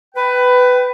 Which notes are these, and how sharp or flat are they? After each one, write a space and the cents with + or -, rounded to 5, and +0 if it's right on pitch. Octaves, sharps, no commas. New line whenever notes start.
B4 +15 G5 -15